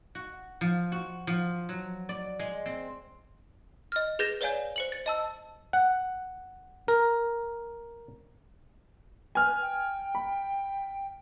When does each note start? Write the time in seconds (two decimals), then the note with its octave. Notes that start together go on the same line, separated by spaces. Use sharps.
0.15 F#4
0.61 F3
0.92 F#4
1.27 F3
1.69 F#3
2.09 D5
2.39 G#3
2.66 C4
3.92 D#5 F6
4.19 G#4 B4 G6 A6 A#6 E7
4.41 B4 C#5 D5 F5 G#5 G6
4.76 C5 C#7 F#7
4.92 A6
5.06 D#5 A5 E6
5.73 F#5
6.88 A#4
9.35 B4 G#5 F6
9.62 G5
10.15 B5